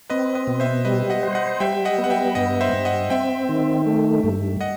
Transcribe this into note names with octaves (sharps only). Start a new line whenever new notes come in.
C4 B4 D#5
B4 D#5
B2
C5 E5
G3 B4 D#5
D#5 F#5
C5
D#5 F#5
G3 E5 G5
D#5 F#5
B3
F#5
E5 G5
G2 D#5 F#5
C5 E5
G2
D#5 F#5
C4 E5 G5
D#3
A3
G2
D#5 F#5